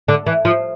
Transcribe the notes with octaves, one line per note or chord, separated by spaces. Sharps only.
D3
E3
F3